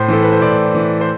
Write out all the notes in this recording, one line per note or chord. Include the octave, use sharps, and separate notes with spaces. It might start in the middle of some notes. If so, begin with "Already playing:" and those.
Already playing: A2 C5
E3 A4
B4
C5
A2 D5
E3
C5